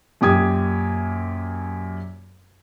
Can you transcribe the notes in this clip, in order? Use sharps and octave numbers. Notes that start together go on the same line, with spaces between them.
F#2 A#2 G4 D#6 G#6